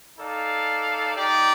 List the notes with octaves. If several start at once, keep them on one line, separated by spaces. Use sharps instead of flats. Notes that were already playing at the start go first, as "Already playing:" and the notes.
D#4 A4 D5 F5
D#4 G4 D5